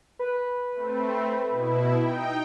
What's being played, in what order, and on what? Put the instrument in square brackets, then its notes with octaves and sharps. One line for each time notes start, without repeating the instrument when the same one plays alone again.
[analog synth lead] B4
[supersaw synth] A3 C4
B2 E4
D#4 G5